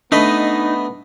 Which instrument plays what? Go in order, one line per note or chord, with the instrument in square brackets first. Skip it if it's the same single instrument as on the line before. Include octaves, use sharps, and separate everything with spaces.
[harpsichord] A3 B4 D#5 [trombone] B3 [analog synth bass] D4 [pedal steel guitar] D#4